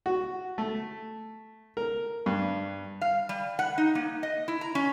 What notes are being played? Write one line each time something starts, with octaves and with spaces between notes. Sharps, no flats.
F#4
A3
A#4
G2
F5
G3
F#5
D#4
A#3
D#5
E4
A#5
C#4